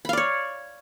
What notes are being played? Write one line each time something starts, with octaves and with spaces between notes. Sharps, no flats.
C#5 D5 F5 B5